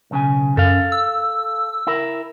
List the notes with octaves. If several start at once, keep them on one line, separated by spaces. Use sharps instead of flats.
B1 C#3 G#5
F#2 A4 F5
E6
E4 A#4